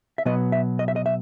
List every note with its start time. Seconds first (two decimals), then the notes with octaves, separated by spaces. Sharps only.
0.18 E5
0.25 B2 F#3 B3 D#5
0.52 E5
0.79 D#5
0.88 E5
0.96 D#5
1.06 E5